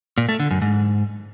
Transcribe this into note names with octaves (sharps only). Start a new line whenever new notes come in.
A#2
A3
D3
F#2
G#2